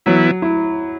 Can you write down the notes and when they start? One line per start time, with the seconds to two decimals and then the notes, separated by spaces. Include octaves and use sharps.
0.06 E3 F#3 B3 E4
0.42 E4